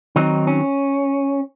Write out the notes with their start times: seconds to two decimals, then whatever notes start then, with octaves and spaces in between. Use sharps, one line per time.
0.16 D#3 F#3 C4 D#4
0.47 C#4